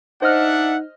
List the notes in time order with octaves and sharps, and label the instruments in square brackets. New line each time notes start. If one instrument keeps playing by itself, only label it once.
[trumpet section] D4 E5 F#5 [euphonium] D#4 [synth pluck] C5 D#5 F6